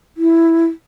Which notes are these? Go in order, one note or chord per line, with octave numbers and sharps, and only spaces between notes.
E4